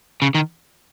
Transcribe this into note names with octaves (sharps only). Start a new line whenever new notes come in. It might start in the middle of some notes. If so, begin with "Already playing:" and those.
C#3
D#3